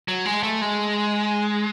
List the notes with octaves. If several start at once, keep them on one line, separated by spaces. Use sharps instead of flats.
F#3
G#3
A3
G#3